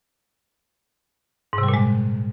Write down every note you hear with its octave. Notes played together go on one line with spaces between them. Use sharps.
G#2
C3
G3
A#2
G#3